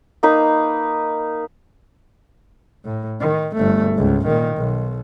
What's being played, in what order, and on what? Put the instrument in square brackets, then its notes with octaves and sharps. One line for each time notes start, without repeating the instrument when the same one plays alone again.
[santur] A#3 D#4 B4
[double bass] A2
D#3
G1 A3
C#2 G#2
A#2 D#3
B1